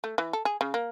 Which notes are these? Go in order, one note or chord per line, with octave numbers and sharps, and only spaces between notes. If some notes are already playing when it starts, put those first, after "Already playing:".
A3
E3
A4
G#4
C#3
A#3